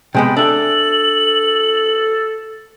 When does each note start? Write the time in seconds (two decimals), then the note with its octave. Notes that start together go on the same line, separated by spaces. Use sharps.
0.15 C3 G#3 B3 G5
0.37 D4 A4 E5 F#7